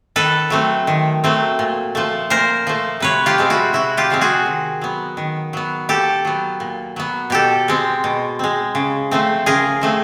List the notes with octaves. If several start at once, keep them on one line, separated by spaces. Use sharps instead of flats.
D#3 A4 B4
F#3 A3 C4
D#3
F#3 A3 C4
A#2
F3 A3
A#2 A#4 C5
F3 A3
C3 B4 C#5
F4 G4
F3 G#3 C4
E4 F#4
C3 E4 F#4
F4 G4
F3 G#3 C4
F#4 G#4
D#3
F#3 B3
D#3
F#3 B3
A#2 G4 A4
F#3 B3
A#2
F#3 B3
B2 G4 A4
G#3 C4
B2
G#3 C4
C#3
F3 A3 C4
C#3 G#4 A#4
F3 A3 C4